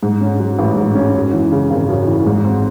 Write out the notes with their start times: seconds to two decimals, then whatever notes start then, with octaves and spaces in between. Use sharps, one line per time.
0.03 G#2
0.21 C#4
0.40 F#3
0.59 A1
0.77 G#2
0.95 C#4
1.14 F#2
1.33 E3
1.52 C#3
1.71 G#1
1.89 F#2
2.07 E3
2.26 G#2
2.45 C4